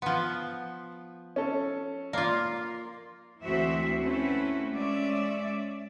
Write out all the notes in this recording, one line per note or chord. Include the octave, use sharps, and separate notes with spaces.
F3 B3 C6
C#4 A4
A#3 F4 D5 A#5 C6
D2 E3 C4 F#4 E5
A3 C4 C#4 E4 F#4 B4
G#3 C#4 D5 E5